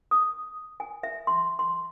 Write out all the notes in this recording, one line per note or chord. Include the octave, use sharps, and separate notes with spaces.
D#6
G#5
E5
C6
C6